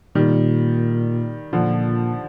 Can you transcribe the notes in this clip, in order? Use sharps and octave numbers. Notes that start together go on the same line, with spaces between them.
A#2 D#3 G3
A#2 D3 F3